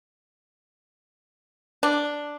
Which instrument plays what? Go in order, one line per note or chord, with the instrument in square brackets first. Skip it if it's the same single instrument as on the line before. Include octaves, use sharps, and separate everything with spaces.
[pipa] D4